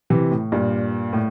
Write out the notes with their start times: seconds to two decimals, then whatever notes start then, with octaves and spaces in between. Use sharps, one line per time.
0.10 C3 E3
0.31 A2
0.52 G2 A#2
1.13 A2